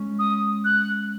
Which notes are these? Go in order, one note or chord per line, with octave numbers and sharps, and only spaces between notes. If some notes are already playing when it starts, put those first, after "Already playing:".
Already playing: G#3 C#4
D#6
F#6